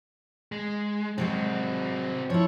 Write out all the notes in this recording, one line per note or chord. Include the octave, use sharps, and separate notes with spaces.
G#3
C3 F#3 G#3 C4 F#4
F3 E4 C#5